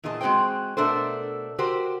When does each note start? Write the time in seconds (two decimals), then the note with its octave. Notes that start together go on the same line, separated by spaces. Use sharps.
0.04 E2 A#2 G#4 D#5 A5
0.21 G#3 C4 F#4 G#4 C5 G5
0.77 B2 A3 D4 A4 A#4 C5
1.59 F#4 G4 A#4 C5